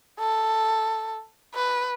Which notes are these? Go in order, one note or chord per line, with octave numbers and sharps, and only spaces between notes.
A4
B4